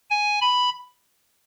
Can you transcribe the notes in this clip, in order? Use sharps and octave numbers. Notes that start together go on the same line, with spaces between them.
G#5
B5